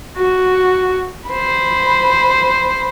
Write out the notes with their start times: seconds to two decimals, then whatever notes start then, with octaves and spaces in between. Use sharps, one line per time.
0.17 F#4
1.28 C5 B5